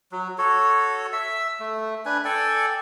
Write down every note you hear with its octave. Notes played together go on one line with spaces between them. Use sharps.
F#3
F#4 A4 C#5
E5 E6
A3
D4 B4 G#5
A4 D5 G5 G#5